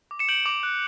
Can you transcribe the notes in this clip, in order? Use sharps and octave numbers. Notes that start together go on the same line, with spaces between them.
D6
C#7 E7
G6 D7 F#7
D6
F#6